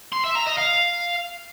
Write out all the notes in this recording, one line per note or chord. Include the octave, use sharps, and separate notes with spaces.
C6
E5
A#5
D#5
F5